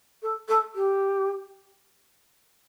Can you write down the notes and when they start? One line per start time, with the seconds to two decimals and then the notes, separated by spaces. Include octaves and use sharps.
0.22 A4
0.48 A4
0.75 G4